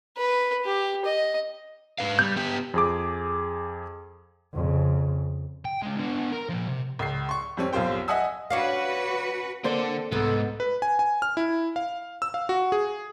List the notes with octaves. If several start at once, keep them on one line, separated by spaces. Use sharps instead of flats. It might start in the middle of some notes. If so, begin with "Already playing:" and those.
B4
G4
D#5
G#2 B4 F5
G3 G6
B3 G4
F2 G#4 D6
F2 C#3
G5
C#3 G#3
D3 B3
A#4
A#2 F3
C3
C#2 C7
C6 C#6
F2 G3 C4 C#4
B1 F#2 F4 G4 C5 G5
D#5 E5 F#5 G#5 D#6 E6
C#4 D4 F#4 B4 F5
D3 A#3 C4 D4 A4 C5 D5
C2 G#2 B3 A4
B4
G#5
G#5
F6
E4
F5
E6
F5
F#4
G#4